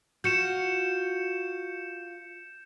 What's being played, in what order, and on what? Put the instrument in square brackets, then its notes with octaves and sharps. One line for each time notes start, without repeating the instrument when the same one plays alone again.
[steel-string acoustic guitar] F4 F#4 [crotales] G6 C#7 E7